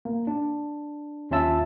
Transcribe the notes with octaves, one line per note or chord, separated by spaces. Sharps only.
A#3
D4
D#2 C#4 F4 E5 A5 E6